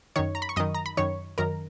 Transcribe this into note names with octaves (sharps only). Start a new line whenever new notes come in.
F#2 D#3 C#5 C#6
A#5
B5
C#6
F#2 D#3 D#5 D#6
A#5
B5
F#2 D#3 C#5 C#6
F#2 D#3 A#4 A#5